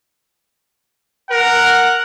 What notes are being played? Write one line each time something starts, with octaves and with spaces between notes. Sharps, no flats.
A#4 F#5